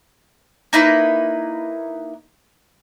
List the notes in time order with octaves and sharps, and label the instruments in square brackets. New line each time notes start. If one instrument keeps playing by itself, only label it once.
[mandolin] A#3 D#4 E4 B4